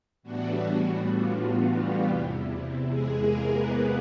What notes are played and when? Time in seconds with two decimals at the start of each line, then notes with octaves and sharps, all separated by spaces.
0.23 A2 E3 G3 B3 D4 F#4
1.12 F4
1.42 F#4
1.71 G3 G4
2.01 E2 C3 E3
2.91 G#3 G#4
3.20 A#3 A#4
3.50 B3 B4